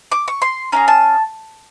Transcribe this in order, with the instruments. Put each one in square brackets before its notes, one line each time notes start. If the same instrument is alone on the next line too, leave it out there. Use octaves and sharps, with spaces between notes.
[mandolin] D6
C#6
C6
C#4 E4 G#4 A#5
A5